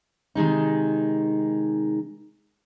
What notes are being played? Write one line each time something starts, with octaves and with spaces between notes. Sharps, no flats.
C3 D#3 G#3 D#4